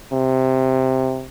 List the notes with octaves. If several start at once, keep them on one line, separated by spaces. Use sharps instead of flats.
C3